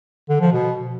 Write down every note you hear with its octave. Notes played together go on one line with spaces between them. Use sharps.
D3
F3
B2